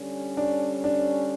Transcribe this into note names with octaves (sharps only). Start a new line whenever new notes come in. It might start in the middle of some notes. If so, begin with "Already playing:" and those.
Already playing: D3 G3 C#4
D4
D4